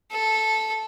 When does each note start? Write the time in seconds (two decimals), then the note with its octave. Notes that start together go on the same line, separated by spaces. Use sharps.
0.12 A4